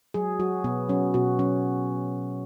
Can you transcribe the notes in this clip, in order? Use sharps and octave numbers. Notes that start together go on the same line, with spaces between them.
F#3 G#4
F#3 F#4
B2 B3
F#3 C#4
B2 F#4
F#3 C#4